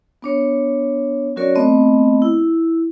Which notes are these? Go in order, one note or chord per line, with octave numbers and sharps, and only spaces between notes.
B3 D4 C#5
F#3 C#4 F#4 A#4 C#5 D5
A3 B3 C4 D#5 B5
E4